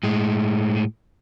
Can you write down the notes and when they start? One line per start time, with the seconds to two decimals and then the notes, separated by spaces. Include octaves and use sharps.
0.03 A2 G#3